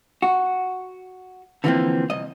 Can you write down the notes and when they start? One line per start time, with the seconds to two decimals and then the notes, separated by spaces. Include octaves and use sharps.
0.22 F#4
1.64 D3 E3 F3 A3 A#3 C4
2.10 C2 D#5